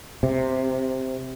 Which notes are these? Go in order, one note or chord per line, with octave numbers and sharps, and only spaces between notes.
C3